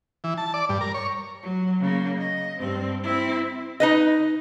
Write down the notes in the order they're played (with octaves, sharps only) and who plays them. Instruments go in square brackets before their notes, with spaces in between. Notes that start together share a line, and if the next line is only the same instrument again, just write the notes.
[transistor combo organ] E3
A5
D5
G2
A#4
C#5
[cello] F#3
C#3 A#3
D#5
G2 C4
C4 E4
[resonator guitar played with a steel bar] D#4 B4 D#5